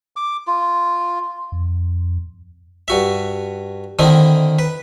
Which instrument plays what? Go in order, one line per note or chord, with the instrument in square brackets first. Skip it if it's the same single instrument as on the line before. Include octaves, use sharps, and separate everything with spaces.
[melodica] D6
F4
[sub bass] F2
[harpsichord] G2 F#4 E5
D3 D#3 C4 D#4 E4
B4